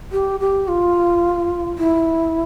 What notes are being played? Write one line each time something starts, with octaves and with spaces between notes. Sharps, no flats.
G4
G4
F4
E4